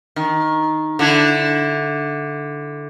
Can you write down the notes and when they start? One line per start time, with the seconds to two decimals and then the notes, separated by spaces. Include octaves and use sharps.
0.16 D#3
0.99 D3 E4